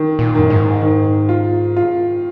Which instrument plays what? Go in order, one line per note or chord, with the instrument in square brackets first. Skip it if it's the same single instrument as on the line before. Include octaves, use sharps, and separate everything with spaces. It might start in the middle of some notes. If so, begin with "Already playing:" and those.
Already playing: [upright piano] D#3
[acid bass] A#2
[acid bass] F#2 [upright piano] D#3
[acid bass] G#2
[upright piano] D#3
F4
F4